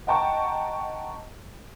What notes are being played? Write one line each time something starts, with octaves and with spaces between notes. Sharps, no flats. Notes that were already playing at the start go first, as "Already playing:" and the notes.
D#5 F#5 G5 A5 A#5 C#6